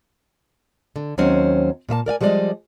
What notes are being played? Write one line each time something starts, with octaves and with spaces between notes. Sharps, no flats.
D3
D#2 F#3 C4 C#4 C5
A#2 A#3 E5 A5
A#4 D5 F5 G#5
F3 G3 G#3 B4 D5 D#5